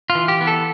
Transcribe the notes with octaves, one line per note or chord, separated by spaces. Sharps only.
F4
E3
G4
B3
A4